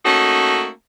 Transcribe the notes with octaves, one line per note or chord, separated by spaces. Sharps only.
A3 A#3 C#4 D#4 F#4 A4